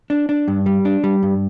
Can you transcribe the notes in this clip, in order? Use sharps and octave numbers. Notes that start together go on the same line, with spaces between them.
D4
D4
G2
G3
D4
G3
G2